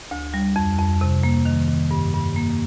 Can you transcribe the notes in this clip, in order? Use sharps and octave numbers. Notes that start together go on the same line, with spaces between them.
D2
G3
F2
F2
C3
A#3
D#3
D#3
G2
G2
A#3